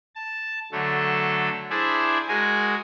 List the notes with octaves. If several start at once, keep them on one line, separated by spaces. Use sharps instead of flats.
A5
D3 F#3 A3 A4
D4 E4 G#4 C5 D5 E5
G#3 F#4 G#4 A#4 G#5